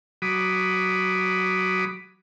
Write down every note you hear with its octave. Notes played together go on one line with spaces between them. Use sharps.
F#3 B5 D6 D#6